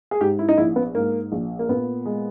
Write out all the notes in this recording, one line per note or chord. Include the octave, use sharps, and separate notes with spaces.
G#4
G#2 G4
E4
D#4
A#1 E4
B3
G#2 A#3
A#1
A#3
A#2 B3
G#3